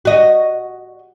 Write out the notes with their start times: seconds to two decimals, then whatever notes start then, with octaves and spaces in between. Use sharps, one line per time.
0.05 F#4 D#5